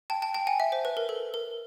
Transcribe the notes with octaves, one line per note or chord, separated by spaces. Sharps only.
G5 A5
G5 A5
G5 A5
F#5 G#5
E5
C5
B4
A#4
A4
A#4